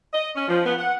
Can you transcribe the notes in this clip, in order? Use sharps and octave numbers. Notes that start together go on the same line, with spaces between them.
D#5
C#4
F3
B3
F#5